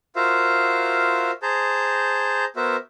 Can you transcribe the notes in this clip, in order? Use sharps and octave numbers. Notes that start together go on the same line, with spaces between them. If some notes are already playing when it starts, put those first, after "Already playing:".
F4 F#4 A#4 C5 E5 F5
G#4 C5 A5 A#5 G6
B3 F#4 A#4 C5 E5